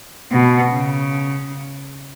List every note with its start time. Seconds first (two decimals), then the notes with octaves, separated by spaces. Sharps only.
0.32 B2
0.71 C#3